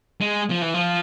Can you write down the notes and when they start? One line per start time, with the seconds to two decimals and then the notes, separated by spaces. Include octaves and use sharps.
0.21 G#3
0.50 F3
0.62 E3
0.74 F3